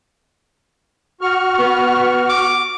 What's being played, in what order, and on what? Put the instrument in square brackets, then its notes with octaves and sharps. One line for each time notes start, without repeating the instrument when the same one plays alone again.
[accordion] F#4 C#6 F6
[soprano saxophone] B3
D6